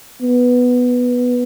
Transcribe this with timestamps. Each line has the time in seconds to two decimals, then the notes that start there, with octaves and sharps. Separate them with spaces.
0.21 B3